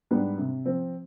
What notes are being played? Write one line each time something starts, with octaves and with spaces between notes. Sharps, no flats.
G#2 G3 B3 D4
C3
F3 C4